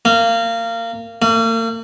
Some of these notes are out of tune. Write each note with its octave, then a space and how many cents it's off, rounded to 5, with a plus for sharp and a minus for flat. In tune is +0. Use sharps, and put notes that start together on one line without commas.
A#3 -25
A#3 -45